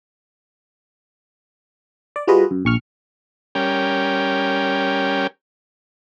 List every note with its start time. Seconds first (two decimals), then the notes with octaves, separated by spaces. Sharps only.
2.16 D5
2.27 G3 F4 F#4 G#4 B4 D#5
2.51 F#2
2.65 A#1 C#6 F6
3.55 G3 C#4 A#4 G5